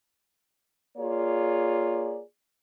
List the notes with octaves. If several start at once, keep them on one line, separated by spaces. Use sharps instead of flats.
A#3 F4 G#4 C#5 D5